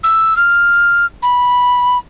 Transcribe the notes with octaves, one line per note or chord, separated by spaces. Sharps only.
E6
F6
B5